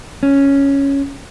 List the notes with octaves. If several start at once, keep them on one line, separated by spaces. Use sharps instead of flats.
C#4